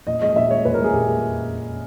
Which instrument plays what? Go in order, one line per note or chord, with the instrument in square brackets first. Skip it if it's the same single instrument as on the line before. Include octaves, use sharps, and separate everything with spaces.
[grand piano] A#2 D#5
G#3 D#5
A#2 E5
G#3 C#5
A#2 B4
G#3 A#4
G#4
A#2 G4